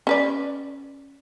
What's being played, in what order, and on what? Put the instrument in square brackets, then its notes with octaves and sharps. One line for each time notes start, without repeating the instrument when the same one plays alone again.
[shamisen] C#4 B4 D5